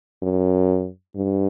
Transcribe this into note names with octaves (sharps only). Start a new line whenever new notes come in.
F#2
G2